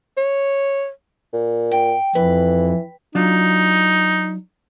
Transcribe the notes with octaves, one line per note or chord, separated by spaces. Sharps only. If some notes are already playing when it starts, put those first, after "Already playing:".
C#5
A#2
G5
F2 E3 B4
F#3 D4 D#4 F4